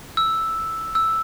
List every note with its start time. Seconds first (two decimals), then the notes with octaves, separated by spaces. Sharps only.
0.17 E6
0.95 E6